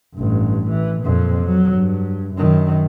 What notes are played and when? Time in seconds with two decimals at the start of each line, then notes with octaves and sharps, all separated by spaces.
0.16 A1 G2
0.69 E3
1.01 F2 A#2
1.44 F#3
1.73 G2
2.34 F#2 D#3